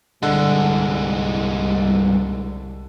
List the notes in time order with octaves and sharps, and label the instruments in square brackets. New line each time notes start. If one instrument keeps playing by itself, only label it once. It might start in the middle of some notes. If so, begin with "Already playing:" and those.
[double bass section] C2 [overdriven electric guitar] G2 G#3 [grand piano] D3